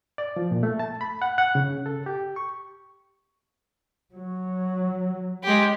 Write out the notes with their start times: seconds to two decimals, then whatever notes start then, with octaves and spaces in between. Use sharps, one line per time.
0.18 D5
0.36 F3
0.51 A#2
0.63 A3
0.79 A5
1.01 B5
1.22 F#5
1.38 F#5
1.55 C#3
1.86 A4
2.06 G4
2.36 C#6
4.14 F#3
5.44 G#3 G4